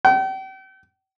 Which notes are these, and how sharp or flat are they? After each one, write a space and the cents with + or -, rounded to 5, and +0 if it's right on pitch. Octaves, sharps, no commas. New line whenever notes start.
G5 -40